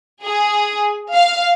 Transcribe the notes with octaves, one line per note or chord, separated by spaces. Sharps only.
G#4
F5